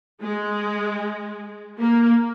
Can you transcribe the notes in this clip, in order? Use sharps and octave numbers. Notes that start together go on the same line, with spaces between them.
G#3
A#3